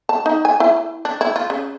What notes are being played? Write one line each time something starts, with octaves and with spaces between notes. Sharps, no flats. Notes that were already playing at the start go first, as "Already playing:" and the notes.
A5
D#4
G#5
E4
D4
E4
F4
C#3